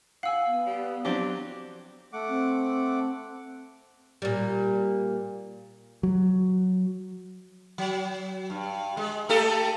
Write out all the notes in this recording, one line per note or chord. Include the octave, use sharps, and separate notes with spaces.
F5 F#5 G#5 E6
B3
G3
F#3 C4 D4 G4
A3 F#5 D6
C4
A#2 G3
F#3
F#3
G2
G#3
A3 G4 A4